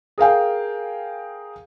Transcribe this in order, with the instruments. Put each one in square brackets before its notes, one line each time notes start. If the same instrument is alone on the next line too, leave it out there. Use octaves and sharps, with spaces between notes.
[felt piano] G#4 A#4 F5 G5